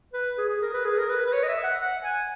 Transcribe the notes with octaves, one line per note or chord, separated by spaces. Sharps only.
B4
G#4
G#4
A#4
B4
G#4
A#4
B4
B4
C#5
D#5
E5
F#5
F#5
G#5